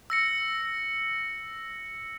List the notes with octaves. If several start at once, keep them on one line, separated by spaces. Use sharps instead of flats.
E6 A#6 C#7